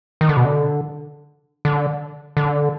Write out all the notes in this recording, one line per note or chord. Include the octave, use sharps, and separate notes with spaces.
D#3
D3
B2
D3
D3
D3